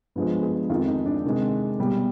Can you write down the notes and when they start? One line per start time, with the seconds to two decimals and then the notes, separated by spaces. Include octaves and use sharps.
0.16 G2 F3 G#3 B3
0.43 G#4
0.69 F2 D#3 G#3 F4
0.87 D#4
1.06 D4
1.25 C3 D#3 G#3
1.79 B2 G3